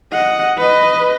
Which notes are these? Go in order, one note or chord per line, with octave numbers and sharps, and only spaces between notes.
D#5 F#5
B4 D#5